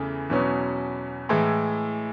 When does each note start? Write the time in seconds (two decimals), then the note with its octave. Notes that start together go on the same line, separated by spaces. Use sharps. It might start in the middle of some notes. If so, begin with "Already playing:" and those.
Already playing: E2 C#3 E3 A3
0.30 E2 B2 F#3 C#4
1.29 A2 E3 G#3